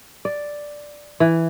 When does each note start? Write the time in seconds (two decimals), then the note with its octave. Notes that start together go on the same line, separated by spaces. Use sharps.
0.25 D5
1.20 E3